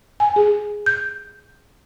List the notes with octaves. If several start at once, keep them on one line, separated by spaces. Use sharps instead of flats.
G#5
G#4
G6